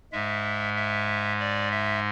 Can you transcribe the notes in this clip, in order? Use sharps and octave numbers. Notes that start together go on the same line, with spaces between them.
G#2 G#3 E5
E5
D5
E5